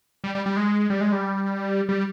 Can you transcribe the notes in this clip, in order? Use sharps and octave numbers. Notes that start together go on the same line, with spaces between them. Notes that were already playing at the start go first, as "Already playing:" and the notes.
G3
G3
G3
G#3
G3
G#3
G3
G3